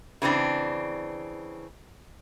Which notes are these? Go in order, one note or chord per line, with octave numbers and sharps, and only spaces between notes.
C#3 E3 C4 D4